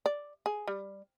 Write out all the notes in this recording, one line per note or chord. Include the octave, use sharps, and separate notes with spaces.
D5
G#4
G3